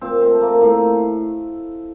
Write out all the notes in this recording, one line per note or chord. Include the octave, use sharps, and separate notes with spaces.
A#2 C4
C4
A3
A#3
A2 A#3